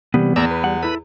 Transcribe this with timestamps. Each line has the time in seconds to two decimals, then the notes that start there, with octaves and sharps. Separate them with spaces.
0.14 C3 E3 G3 A#3 B3
0.36 E2 D5 A#5 E6
0.51 B4
0.64 G3 F#5
0.83 E4 A4 B4 B5